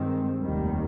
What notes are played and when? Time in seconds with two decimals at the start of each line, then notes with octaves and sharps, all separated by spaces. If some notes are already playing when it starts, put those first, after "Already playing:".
Already playing: G2 D#3 G#3 C4
0.41 F1 D#2 D#3 G3